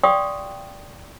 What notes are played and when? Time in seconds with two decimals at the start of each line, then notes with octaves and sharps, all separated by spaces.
0.04 D5 F5 G5 C6 C#6 D#6